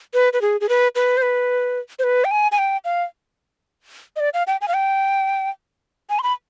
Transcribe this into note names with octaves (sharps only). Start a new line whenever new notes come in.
B4
B4
G#4
G#4
B4
B4
C5
B4
C5
B4
G5
G#5
G#5
G5
F5
D#5
D5
F5
G5
G#5
F5
G5
G#5
C6
B5